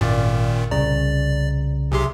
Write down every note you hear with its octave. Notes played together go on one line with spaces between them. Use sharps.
G#1 F#2 A#2 D#3 D5 F5
C2 C#3 D5 A#5
B1 C3 G4 G#4 E5 C6